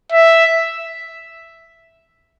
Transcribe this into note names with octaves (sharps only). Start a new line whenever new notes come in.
E5